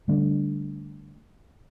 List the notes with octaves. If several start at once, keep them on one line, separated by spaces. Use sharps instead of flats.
D3 G3 A3 D4